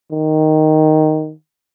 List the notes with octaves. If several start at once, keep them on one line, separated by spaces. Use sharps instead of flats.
D#3